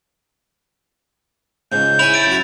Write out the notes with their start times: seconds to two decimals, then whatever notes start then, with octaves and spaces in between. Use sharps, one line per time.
1.72 C#2 G#2 G6
1.99 E4 C#5 G#5 F7
2.14 A6 D7
2.27 F#2 F#4